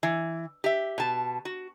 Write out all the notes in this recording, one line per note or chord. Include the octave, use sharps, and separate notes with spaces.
E3
G4 E5
B2 A5
F#4